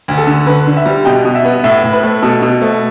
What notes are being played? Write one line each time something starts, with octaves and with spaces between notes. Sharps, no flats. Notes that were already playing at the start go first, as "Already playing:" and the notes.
D2
A4
D3
D3 B4
D3
E5
G3
B2 G5
B2
E5
B3
A2 E5
A2
B4
A3
B2 A4
B2
A3